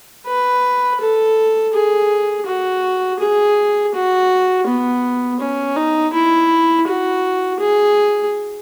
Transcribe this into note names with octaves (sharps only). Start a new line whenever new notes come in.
B4
A4
G#4
F#4
G#4
F#4
B3
C#4
D#4
E4
F#4
G#4